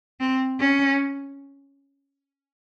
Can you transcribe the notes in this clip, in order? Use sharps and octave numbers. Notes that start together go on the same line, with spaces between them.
C4
C#4